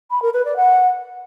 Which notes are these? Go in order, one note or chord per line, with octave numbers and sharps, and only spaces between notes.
B5
A#4
B4
D5
F#5